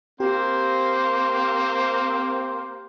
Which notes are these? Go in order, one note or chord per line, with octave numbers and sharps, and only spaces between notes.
A#3 C4 G4 C5